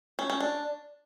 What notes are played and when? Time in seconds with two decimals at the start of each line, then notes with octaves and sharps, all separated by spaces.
0.19 C#4
0.30 C#4
0.40 D4